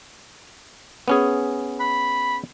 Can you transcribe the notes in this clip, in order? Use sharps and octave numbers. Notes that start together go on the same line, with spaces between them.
B3 C#4 G#4
B5